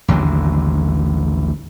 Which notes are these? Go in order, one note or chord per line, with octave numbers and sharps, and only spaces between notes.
A1 D#2 D3 F#3